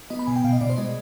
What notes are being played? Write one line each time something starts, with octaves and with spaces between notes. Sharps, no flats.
B3 D#5
B5
B2 G#5
G5
B2 F5
D#5
B2 D5
C5
G#3 D#5